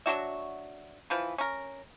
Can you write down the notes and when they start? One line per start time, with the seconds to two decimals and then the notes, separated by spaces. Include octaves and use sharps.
0.06 F#3 D4 F#4 E5
1.10 E3 F3 B4
1.38 C#4 A#4